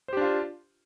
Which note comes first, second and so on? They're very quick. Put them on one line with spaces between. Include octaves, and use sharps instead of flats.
C5 G4 D4 F4